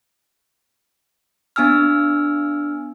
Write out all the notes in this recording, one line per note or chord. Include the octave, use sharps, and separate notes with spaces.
B3 D4 G#5 E6 F6